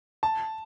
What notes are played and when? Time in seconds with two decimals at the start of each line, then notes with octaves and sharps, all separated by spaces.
0.23 A5